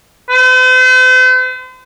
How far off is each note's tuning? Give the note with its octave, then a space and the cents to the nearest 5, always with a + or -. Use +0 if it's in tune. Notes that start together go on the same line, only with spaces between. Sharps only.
C5 -45